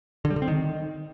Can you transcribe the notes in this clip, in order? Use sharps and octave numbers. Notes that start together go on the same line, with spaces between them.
D3
G3
D3
C4
D#3